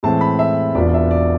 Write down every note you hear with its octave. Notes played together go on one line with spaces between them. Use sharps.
A2 E3 G#3 C4 A5
B5
E5
E1 E2 B2 B3 F4 D5
E5
D5